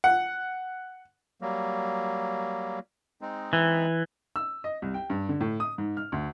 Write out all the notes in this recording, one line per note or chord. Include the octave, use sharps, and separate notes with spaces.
F#5
F#3 G3 A#3
G#3 C4 D#4
E3
E6
D#5
C2
G5
G2
D3
A2
D#6
G#2
F6
D2